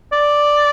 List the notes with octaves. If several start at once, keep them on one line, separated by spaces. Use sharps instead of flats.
D5